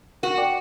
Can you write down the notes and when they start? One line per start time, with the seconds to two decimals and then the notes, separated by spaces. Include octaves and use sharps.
0.23 F#4 A#4
0.38 D5 G5 D6